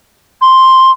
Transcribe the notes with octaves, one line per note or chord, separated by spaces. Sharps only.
C6